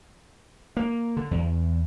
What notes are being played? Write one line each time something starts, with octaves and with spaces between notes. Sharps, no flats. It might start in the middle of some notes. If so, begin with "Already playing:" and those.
A#3
D3
E2